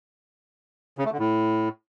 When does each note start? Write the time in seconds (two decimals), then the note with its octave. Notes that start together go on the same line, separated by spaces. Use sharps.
0.98 C#3
1.05 A3
1.12 D3
1.19 A2